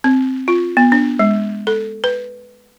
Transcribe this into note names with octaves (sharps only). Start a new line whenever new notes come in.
C4
F4
B3
D4
G#3
A4
B4